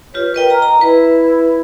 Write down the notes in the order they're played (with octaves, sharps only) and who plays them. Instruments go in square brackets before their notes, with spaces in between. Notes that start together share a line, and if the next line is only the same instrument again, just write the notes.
[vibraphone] F4 G4 B4 [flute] C#5
[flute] A#4 [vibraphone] B4 D#5 G5
[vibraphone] A#5
[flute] D#5 [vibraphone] A#5
[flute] E4 [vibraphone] B4